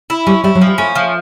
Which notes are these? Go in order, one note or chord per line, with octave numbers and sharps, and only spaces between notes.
E4
G3 C#4
G3 E4
F#3
F3
G3
A3 C#4
F3